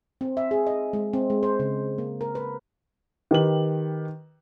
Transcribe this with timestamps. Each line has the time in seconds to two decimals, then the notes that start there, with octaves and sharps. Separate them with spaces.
0.21 C4
0.37 E5
0.51 G#4
0.67 D#5
0.93 G#3
1.13 C4
1.30 G#3
1.43 C5
1.60 C#3
1.98 A#3
2.21 A#4
2.35 B4
3.31 D#3 G4 B4 F#7